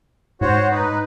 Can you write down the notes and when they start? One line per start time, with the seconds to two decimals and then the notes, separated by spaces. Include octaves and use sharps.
0.41 G#2 F#4 C5 C#5
0.71 D#4 B4